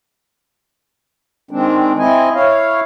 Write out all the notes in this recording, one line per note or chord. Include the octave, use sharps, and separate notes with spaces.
D#3 G#3 C4 D4
C4 E4 D#5 G#5
E4 C#5 F5